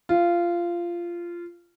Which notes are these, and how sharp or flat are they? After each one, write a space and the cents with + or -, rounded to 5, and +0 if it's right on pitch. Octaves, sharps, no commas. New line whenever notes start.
F4 -15